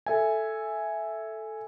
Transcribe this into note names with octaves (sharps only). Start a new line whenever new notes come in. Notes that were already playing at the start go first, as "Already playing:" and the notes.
A4 E5 G#5